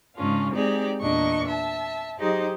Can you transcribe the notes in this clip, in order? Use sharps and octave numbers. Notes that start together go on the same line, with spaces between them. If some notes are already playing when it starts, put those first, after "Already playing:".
G#2 C#3 C#4 D4 F4
G#3 C4 D#4 G4 G#4 D5
E2 A#2 D4 D#5 C#6
E5 A5
F#3 D#4 G4 G#4 C5 D#5